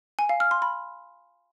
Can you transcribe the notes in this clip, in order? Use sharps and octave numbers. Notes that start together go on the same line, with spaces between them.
G#5
F5
F6
C6
B5